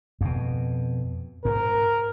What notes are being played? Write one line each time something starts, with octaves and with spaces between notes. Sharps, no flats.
F2 B2
G#2 A#4